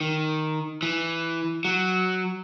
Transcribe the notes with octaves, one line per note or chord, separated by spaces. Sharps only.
D#3
E3
F#3